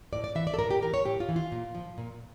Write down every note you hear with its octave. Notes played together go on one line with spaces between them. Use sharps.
A2 D5
D5
E3 E5
D5
A4
A2 A#4
G4
E3 A#4
C#5
A2 G4
F4
E3
F4
A#2
F3
A#2